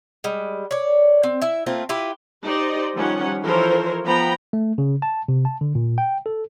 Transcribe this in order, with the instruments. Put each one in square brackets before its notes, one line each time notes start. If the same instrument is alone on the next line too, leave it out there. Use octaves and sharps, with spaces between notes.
[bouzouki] G3 G#3
C#5 D5
C4
E4 E5
A3 A#3 C4 F4
E4 F4 G4 B4
[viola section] D#4 G4 C5 D5 D#5
D#3 F3 G3 C#4 F#5
E3 F3 A4 A#4 C5 C#5
F3 B3 G5 A#5 B5
[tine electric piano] A3
C#3
A5
C3
A5
D3
A#2
G5
A4